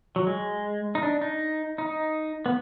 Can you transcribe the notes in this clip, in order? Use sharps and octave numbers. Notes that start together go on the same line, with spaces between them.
F#3
G#3
D#4
D4
D#4
D#4
B3